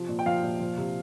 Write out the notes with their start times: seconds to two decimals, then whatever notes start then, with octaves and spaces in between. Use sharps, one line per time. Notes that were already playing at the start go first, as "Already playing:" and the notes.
Already playing: C3 F3
0.09 A#2
0.19 G5
0.26 F3 F5
0.43 A#2
0.60 F3
0.78 C3